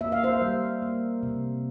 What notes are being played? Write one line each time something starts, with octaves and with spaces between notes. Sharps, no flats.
A#3 E5
F5
C5 E5
G3
A#3
C3